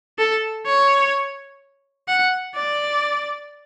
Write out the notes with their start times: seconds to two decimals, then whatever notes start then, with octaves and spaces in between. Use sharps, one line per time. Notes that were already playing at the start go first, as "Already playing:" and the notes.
0.19 A4
0.66 C#5
2.08 F#5
2.55 D5